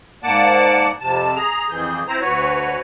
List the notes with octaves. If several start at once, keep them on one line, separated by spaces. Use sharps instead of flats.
G#2 A#3 D5 F#5 A5 D6
F2 C3 A5
G#4 A#5
F2 E3 G#4 G6
C4 E4 C5 A#5
D2 F#4 B4 C#5